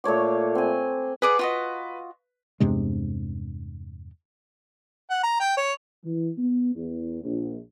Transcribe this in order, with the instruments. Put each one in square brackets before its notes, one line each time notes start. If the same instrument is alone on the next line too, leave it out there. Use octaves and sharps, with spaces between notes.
[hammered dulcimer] A#2 A3 C#5 D6
C4 G#5
[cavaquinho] G#4 D5 F#5 [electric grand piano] B4
[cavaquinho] F4 F#4 D#5
[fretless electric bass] E2 G2 C3 G#3
[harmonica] F#5
A#5
G5
C#5
[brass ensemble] E3
B3
E2
A#1